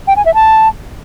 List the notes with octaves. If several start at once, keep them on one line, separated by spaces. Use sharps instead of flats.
G5
G#5
E5
A5